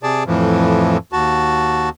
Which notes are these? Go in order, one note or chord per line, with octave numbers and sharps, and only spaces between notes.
C3 G#4 D5 A5
F2 A2 E3 F3
D#2 F#4 A5